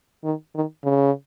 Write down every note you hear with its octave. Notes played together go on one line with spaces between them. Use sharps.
D#3
D#3
C#3